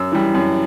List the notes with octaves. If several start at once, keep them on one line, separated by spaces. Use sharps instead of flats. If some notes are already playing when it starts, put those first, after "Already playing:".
Already playing: F#2 E6
E3 G3
F#2